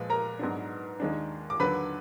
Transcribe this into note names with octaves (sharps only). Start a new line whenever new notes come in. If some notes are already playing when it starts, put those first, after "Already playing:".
Already playing: A#2 F3 G#3 B4
A#4 A#5
G#2 F#3 B3 D4
D#2 D#3 G#3 D4
D6
D#2 D3 F#3 B4 B5